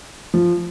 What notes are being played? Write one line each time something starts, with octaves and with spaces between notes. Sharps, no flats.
F3